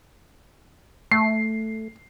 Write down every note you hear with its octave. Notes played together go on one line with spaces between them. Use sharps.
A3 C7